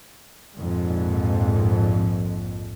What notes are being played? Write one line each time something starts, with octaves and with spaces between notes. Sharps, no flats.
A#1 F2 G#2